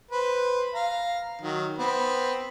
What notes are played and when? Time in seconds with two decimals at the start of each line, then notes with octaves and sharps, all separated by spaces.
0.11 B4 C5
0.74 F5 A#5
1.41 D#3 F#3
1.79 B3 C4 B5